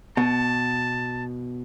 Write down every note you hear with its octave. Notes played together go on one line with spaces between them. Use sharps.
B2 A5